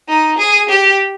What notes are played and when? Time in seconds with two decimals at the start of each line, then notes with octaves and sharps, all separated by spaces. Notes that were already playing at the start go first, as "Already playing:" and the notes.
0.08 D#4
0.38 G#4
0.68 G4